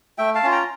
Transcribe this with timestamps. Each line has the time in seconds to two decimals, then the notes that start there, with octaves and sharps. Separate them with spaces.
0.18 A3 E5 G5
0.35 F5 A5
0.43 C#4 F4
0.52 G5 A#5